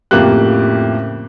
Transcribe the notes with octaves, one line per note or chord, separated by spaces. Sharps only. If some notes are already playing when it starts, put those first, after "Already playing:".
F2 A2 C#3 A#3 G4 F#6